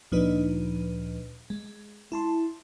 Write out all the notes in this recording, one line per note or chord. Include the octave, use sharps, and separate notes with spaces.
D2 A#2 F3 D4 D#4 B4
G#3
E4 A5 C6